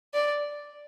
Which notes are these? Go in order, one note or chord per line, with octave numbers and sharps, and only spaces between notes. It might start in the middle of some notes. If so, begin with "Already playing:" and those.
D5